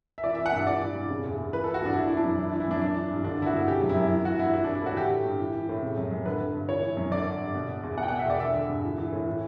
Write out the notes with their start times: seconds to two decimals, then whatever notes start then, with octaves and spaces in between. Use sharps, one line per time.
0.18 E5
0.23 E3 D5
0.35 E5
0.38 E3
0.46 F#5
0.52 G2 E5
0.67 E3 D5
0.81 E3
0.95 G2
1.10 C#3
1.24 E2
1.38 E2
1.53 E3 B4
1.64 A4
1.67 E3
1.74 F#4
1.82 G2 D4
1.93 E3 E4
2.01 D4
2.09 E3 E4
2.17 D4
2.24 F#2
2.39 E3 E4
2.49 D4
2.53 E3
2.60 E4
2.68 F#2 D4
2.82 E3 D4
2.96 E3
3.10 G2
3.24 D3 D4
3.39 D3 E4
3.46 F#4
3.53 G2
3.68 C#3 G4
3.82 F#2
3.89 E4
3.96 F#2
4.11 E3
4.25 E3 F#4
4.39 G2 E4
4.54 E3
4.64 E3 D4
4.75 E4
4.82 A2 F#4
4.96 D3 G4
5.11 D3
5.25 G2
5.40 E3
5.54 E3
5.69 A2
5.83 C#3
5.97 F#2
6.11 F#2
6.26 D3 B4
6.40 D3
6.54 G2
6.69 E3 C#5
6.83 E3
6.97 F#2
7.11 D3 D5
7.26 D3
7.41 G2
7.54 B2
7.69 B2
7.83 E2
7.98 B2 F#5
8.03 G5
8.08 F#5
8.12 B2
8.19 E5
8.26 E2 D5
8.40 D3 E5
8.55 D3
8.69 G2
8.84 E3
8.98 E3
9.12 A2
9.26 E3